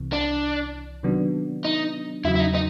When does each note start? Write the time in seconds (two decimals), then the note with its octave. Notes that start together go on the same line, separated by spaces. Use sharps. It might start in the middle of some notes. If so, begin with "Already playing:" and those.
Already playing: C2 C3 E3
0.12 D4
1.03 C3 D#3 F#3 B3 D4
1.65 D#4
2.24 E2 C#3 F#3 E4
2.35 E4
2.40 D#4
2.55 D#4